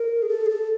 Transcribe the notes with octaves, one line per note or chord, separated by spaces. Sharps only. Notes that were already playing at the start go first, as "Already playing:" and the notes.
Already playing: A#4
G#4
A4
G#4
A4